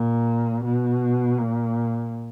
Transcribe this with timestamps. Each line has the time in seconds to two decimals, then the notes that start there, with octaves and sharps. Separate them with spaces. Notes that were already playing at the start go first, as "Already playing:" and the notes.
Already playing: A#2
0.64 B2
1.38 A#2